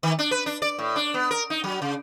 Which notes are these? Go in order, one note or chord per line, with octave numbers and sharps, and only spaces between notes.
D#3
D4
B4
D4
D5
A2
D4
B3
A#4
D#4
F#3
C#3